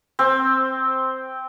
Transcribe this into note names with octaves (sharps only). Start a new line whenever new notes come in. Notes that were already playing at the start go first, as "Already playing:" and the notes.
C4